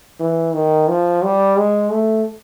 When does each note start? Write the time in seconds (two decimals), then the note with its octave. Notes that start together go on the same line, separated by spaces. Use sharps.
0.20 E3
0.54 D#3
0.89 F3
1.24 G3
1.58 G#3
1.92 A3